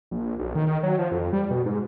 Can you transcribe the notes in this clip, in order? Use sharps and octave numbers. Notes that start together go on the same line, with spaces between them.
A#1
B1
D#3
F#3
F3
F2
G3
B2
G#2